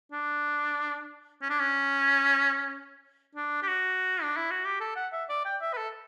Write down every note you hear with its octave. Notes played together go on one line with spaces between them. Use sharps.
D4
C#4
D4
C#4
D4
G4
F#4
D4
E4
F#4
G4
A4
F#5
E5
D5
G5
E5
B4
A4